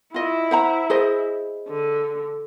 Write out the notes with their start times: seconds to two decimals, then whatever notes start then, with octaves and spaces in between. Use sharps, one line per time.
0.14 E4 F4 D#5
0.51 C5 F#5 A#5
0.90 G#4 C5 D#5
1.68 D3